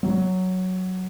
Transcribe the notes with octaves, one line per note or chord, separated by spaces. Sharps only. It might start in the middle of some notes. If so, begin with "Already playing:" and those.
F#3